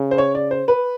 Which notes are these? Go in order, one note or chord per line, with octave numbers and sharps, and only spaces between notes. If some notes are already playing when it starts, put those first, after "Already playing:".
Already playing: C#3
C5
C#5
D5
C5
B4